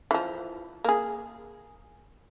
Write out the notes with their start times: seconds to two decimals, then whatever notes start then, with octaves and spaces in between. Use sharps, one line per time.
0.11 E3 F3
0.85 A#3 G#4